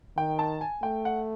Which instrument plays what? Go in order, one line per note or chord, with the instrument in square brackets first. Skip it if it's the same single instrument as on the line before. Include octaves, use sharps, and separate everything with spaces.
[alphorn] D#3 [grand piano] G5
[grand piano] A5
G#5
[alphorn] A3 [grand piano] G5
[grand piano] F#5